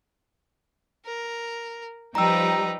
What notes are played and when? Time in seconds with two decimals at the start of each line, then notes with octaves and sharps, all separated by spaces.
1.06 A#4
2.15 F3 G3 D#4 B4 G5 A#5 E6